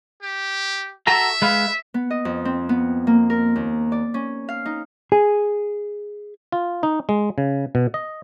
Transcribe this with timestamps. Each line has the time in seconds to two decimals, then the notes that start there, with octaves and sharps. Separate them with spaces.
0.22 G4
1.07 F#4 A4 E5 A#5
1.42 G#3 B4 F5
1.94 B3
2.10 D#5
2.25 F2
2.45 C4
2.69 B3
3.07 A#3
3.30 A#4
3.56 D#2
3.92 D5
4.14 C#4
4.49 F5
4.65 D#4
5.12 G#4
6.52 F4
6.83 D#4
7.09 G#3
7.38 C#3
7.75 B2
7.94 D#5